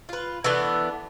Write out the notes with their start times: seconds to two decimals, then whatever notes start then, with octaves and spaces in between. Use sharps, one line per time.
0.09 F4 B4
0.44 E3 A3 B3 D4